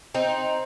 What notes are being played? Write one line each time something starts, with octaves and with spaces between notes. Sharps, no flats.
C4 D#4